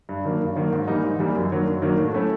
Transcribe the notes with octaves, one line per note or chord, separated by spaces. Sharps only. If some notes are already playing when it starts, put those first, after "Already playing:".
G2
D#3 F#3 A#3
G2
D#3 F#3 A#3
G#2
E3 G3 A#3 D#4
G#2
E3 G3 A#3 D#4
F#2
D#3 F#3 A#3 D4
F#2
D#3 F#3 A#3 D4
A2
F#3 A3 C#4 E4